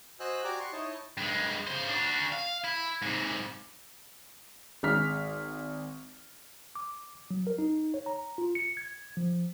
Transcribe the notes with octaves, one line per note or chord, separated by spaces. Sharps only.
F#4 C5 D#5 G#5 E6 F#6
F#4 G4 D5 G#5 A#5 D6
C6 C#6
D#4 E4 C#5 D#5 A5
G2 G#3
C#3 C5
D4 F#4
F5
E4
G#2 C3
G#1 G#3 F6 B6
D6
F#3
A#4
D#4
C#5
A#5
F4
C#7
G#6
F3